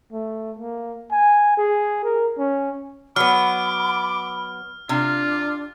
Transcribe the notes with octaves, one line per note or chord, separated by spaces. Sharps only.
A3
A#3
G#5
G#4
A#4
C#4
F#3 B3 B5 D6 F6
C3 D4 F4